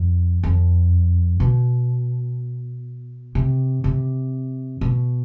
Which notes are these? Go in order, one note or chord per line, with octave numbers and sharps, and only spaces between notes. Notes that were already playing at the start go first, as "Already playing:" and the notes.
Already playing: F2
F2
B2
C3
C3
B2